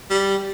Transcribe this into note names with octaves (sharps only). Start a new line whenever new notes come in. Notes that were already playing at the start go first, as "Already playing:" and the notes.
G3